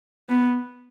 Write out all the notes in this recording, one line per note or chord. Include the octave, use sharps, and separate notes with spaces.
B3